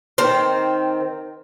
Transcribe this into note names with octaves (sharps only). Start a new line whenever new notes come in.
D#3 C4